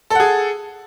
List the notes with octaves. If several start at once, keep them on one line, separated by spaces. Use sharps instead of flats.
G#4 A4 F#5